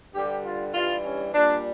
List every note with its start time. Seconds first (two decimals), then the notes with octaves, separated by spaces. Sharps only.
0.14 G2 D3 G3 G4
0.44 F4
0.74 G2 E3 G3 F4
1.04 C#4
1.34 A#2 G3 D4